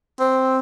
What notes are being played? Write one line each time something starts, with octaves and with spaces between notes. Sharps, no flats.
C4